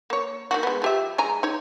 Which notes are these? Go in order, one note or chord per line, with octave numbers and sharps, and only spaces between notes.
A#3 C#5
D#3 E3 F#4
G#3 B3
F3 G4 E5
G#3 G#5 A#5
D#4 C#5